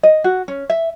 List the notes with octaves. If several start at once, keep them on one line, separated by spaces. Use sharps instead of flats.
D#5
F#4
C#4
E5